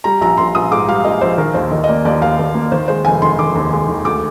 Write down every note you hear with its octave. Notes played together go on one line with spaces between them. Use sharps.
G3 A#5
A#1 A#5
A#1 C6
A#1 D#6
G#2 D6
G3 F5
A#1 D#5
A#1 C5
D#3 A#4
D#2 C5
D#3 D#5
D#5
A#3 D5
D#2 D5
D#2 F5
D#2
A#3
D#3 C5
G#3 C5
F1 G#5
D#3 C6
D#3 D6
D#2
G#3
D#3
D2 D6